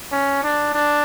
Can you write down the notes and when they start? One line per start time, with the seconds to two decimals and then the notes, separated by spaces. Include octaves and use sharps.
0.12 C#4
0.43 D4
0.73 D4